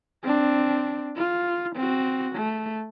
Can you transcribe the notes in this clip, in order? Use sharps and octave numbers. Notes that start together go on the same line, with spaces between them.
C4 D4
F4
C4 F#4
A3